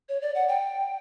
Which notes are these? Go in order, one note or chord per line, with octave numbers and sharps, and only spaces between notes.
C#5
D5
F#5
G5